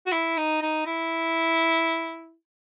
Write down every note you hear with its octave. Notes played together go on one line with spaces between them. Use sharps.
F#4
E4
D#4
D#4
E4